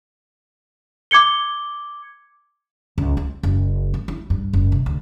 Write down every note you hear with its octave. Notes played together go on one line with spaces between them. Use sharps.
D6 G#6 C#7 G7
C#2
C4
F#1
A3
E4
G2
F#1
C3
D2